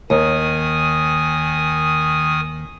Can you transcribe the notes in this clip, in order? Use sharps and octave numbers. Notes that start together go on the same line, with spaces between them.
D#2 D#3 G#5 D#6